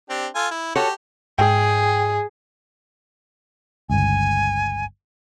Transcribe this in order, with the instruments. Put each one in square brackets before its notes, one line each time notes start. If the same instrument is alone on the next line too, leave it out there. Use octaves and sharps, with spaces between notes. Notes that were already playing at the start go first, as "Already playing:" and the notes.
[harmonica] C4 D4 G4
F4 A4 G#5
E4
[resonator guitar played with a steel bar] F#4 A4 C#5 [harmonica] G4
[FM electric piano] G#2 [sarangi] G#4 [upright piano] G5
[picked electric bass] G1 C#2 [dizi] G#5